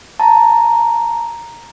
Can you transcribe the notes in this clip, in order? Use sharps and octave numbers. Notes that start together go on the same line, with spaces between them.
A5 A#5